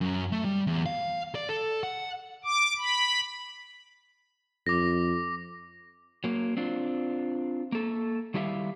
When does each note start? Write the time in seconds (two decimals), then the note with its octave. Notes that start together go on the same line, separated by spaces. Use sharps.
0.01 F#2
0.32 A3
0.45 G3
0.67 E2
0.86 F5
1.35 D5
1.49 A4
1.83 F#5
2.44 D6
2.78 B5
4.67 F2 D6 A#6
6.24 F#3 A#3
6.57 C4 D4 F4
7.72 A#3 A4
8.34 D#3 G3 E4 G4 E5 F5